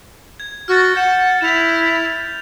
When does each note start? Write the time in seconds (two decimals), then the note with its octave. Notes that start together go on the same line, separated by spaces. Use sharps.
0.40 G#6
0.68 F#4 F6 A6
0.96 F#5 G6 E7
1.41 E4 E7 F7